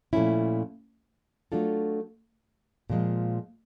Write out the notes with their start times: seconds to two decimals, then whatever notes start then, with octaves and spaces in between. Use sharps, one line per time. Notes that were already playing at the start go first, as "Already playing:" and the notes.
0.13 A#2 F3 A3 C#4 E4
1.52 F#3 A3 D4 F4 A4
2.90 A#2 F3 G#3